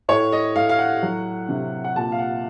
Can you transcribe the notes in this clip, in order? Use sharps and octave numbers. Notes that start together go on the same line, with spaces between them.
A2 C#5
D#5
A2 F5
F5
F#5
F#3
C3
F#5
A#2 A5
F5
F#5